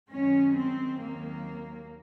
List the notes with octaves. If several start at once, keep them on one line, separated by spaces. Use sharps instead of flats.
F#2 D#3 G#3 C#4
C4
D#2 D#3 F#3 A#3